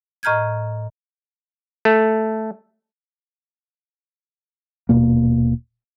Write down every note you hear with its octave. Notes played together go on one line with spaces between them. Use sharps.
A2 D#5 A#5 F6 G6 G#6
A3
D#1 C#2 B2 A#3